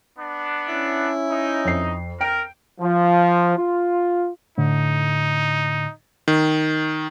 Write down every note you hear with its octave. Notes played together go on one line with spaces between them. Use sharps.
B3 D4
C#4 E4
D#4
F2 C7
A#4 G5 D7
F3
F4
A2 D3 D#4
D#3